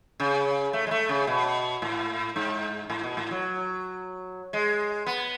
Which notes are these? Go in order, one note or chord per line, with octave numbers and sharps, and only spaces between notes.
C#3
A3
G#3
A3
C#3
B2
A2
G#2
A2
B2
A2
F#3
G#3
B3